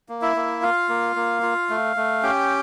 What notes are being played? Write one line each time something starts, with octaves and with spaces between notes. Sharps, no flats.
A#3
E4 E5
A#3
F4 F5
A#3
A#3
F4
A3
A3
C#4 G4 G5